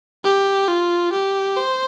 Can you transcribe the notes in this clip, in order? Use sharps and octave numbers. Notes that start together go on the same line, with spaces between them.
G4
F4
G4
C5